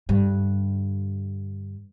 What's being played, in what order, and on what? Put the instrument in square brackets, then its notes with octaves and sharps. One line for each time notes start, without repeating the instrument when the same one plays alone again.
[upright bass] G2 D3